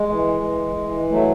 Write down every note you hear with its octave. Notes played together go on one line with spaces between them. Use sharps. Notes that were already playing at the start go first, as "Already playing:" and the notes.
Already playing: G#3
E3
E3
E3
F#3 A3